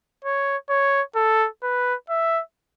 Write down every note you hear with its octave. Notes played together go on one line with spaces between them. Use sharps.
C#5
C#5
A4
B4
E5